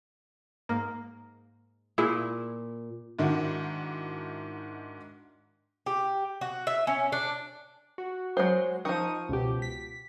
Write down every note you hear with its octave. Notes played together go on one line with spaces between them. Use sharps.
G#2 A#3
A#2 E4 G#4
G#2 D#3 D4 E4 F#4
G4
F#4
E5
C#4
D4
F#4
F#3 G#3 C5
D#3 F3 D#4 C#6 D#6
C#2 B2 G4
B6